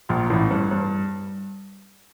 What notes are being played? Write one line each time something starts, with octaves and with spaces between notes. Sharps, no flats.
A#1 A#2
A1 A2
G2
G2